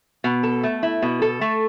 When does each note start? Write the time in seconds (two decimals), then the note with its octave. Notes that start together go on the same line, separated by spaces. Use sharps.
0.24 B2
0.43 A4
0.63 A3
0.83 E4
1.02 B2
1.22 A4
1.41 A3